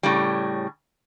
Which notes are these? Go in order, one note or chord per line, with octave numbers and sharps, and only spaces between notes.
A2 C#3 G3